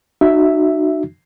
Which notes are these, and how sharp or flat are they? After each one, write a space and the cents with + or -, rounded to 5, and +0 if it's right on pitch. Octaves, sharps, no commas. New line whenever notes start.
D#4 -35 F#4 +0 E5 +0